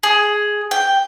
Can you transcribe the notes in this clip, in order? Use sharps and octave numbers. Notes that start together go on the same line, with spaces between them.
G#4
G5